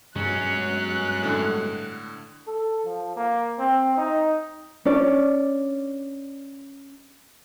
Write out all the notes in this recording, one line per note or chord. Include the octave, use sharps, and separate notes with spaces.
G2 B2 F#3 G#3 C#4 F#6
A2 D3
A4
F3
A#3
C4
D#4
C#4 D4 D5